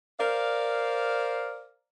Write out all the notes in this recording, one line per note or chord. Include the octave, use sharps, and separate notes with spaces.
A#4 C5 D5 F5